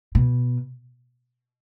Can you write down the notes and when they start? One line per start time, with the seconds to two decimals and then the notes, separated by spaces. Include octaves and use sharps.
0.15 B2